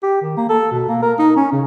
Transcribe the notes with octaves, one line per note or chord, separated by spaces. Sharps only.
G4
D#3
A#3
A4
B2
A#3
A#4
D#4
C#4
C#3